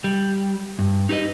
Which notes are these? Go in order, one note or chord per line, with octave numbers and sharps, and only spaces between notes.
G3
G2
D#4 G4 B4 D#5